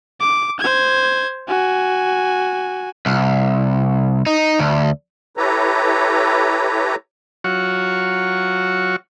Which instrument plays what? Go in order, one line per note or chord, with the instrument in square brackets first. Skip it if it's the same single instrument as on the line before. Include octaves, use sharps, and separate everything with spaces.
[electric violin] D6
C5 G#6
F#4 G#5
[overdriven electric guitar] C2
D#4
D2
[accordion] E4 G4 A4 B4 C#5 A#5
[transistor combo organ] F#3 F4 F#4 C#5 C#6